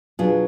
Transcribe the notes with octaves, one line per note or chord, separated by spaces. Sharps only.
B2 F#3 D4 F4 G#4